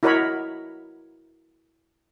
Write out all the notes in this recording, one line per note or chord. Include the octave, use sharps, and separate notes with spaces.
E4 F#4 A#4 C#5 D#5 B5